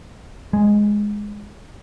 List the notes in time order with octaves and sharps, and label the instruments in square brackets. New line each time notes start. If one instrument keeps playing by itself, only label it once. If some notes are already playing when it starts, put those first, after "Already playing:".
[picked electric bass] G#3